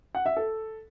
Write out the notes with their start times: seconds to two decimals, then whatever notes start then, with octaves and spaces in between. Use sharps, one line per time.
0.15 F#5
0.26 E5
0.37 A4